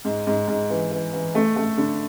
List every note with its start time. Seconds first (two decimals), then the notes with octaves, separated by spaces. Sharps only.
0.05 G#2
0.27 G#2
0.48 G#2
0.70 E3
0.91 E3
1.13 E3
1.35 A3
1.56 A3
1.78 D3